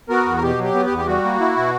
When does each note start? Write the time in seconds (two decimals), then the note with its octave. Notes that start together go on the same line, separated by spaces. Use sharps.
0.09 B3 F#4 A#4
0.26 E2
0.37 A#4
0.42 B2 G4
0.59 F#3 G4
0.74 B3
0.85 G4
0.91 E2
0.98 G4
1.07 G3 F#4
1.24 A#3
1.40 E4
1.57 B2